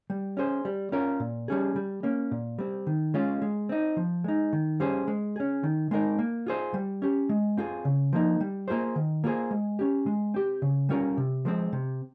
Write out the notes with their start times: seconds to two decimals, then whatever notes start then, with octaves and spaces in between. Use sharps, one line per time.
0.10 G3
0.37 C#4 G#4 C5
0.65 G3
0.92 C#4 F4 A#4
1.20 A#2
1.48 G3 C#4 G#4
1.76 G3
2.03 A#3 C#4
2.31 A#2
2.59 G3 C4
2.87 D#3
3.14 G#3 C#4 F4
3.42 G#3
3.69 C4 D#4
3.97 F3
4.24 G#3 D#4
4.53 D#3
4.80 G3 C#4 G#4 C5
5.08 G#3
5.36 C#4 G#4
5.63 D#3
5.91 G#3 C4 D#4 A#4
6.19 A#3
6.47 F4 G#4 C5
6.74 G3
7.02 C#4 G4
7.29 G#3
7.57 C4 F4 G#4
7.85 C#3
8.13 F3 A#3 D#4
8.40 G3
8.68 A#3 F4 G#4 C5
8.96 D#3
9.24 A#3 F4 G#4 C5
9.51 G#3
9.79 C#4 G4
10.06 G#3
10.34 C4 G4
10.62 C#3
10.89 G3 C#4 F4 A#4
11.17 C3
11.45 F3 G#3 C4
11.72 C3